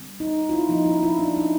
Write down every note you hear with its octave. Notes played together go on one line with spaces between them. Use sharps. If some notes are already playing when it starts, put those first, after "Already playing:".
Already playing: D3 G3 C4
D#4
F4
E4
F3 A#3 C#4 D#4
E4
F4
E4
D4
D#4